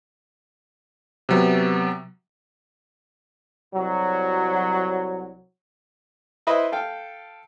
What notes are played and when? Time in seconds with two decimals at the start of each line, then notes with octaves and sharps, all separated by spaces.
1.29 C3 F#3 B3
3.74 C2 F#3
6.47 E4 B4 C5 D#5 E5
6.72 A4 F5 G5